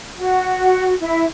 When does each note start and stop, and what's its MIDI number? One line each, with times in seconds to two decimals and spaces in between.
0.16 0.94 66
1.00 1.24 64